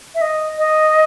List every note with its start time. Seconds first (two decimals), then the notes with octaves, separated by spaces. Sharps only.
0.15 E5
0.21 D#5
0.58 D#5